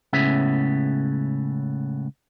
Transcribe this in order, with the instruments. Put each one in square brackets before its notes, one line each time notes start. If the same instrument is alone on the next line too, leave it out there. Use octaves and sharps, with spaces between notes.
[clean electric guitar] C#2 A2 C#3 B3 C#4 E5